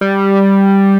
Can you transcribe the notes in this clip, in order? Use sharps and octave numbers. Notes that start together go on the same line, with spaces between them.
G3